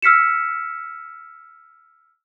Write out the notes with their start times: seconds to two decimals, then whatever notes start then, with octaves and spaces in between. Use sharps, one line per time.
0.02 E6 F6 B6 C#7 E7